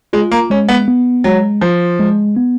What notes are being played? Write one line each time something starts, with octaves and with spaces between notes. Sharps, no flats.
G#3 F4
A#3
G#3 C#4
B3
B3
F#3 G#3
F3 F4
G#3
B3